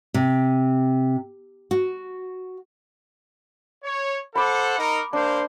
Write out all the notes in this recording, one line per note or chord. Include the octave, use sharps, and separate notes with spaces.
C3
F#4
C#5
A4 C5 F#5 B5 D6
D#4 A#4
A#3 D4 C5